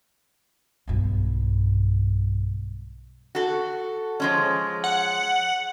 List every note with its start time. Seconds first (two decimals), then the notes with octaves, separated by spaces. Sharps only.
0.88 B1 G2
3.35 F#4 A4
4.20 F3 G#3 C#4
4.84 F#5